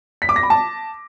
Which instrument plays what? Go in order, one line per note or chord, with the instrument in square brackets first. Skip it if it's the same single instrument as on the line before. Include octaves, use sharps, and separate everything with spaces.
[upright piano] B6
D6
A#6
B5
A5